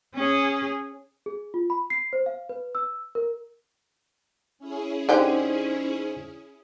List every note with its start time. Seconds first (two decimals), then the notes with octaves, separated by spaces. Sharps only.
0.14 C#4 G#4
1.26 G#4
1.54 F4
1.70 B5
1.90 C7
2.13 C5
2.26 F5
2.49 B4
2.75 E6
3.15 A#4
4.59 C#4 E4 G#4
5.09 D3 D#4 G4 C5 G5 G#5